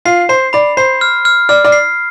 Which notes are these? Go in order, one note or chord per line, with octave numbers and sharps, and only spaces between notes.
F4 C7
C5 C7
D5 B5
C5 C7
F6
F6
D5 F6
D5
C7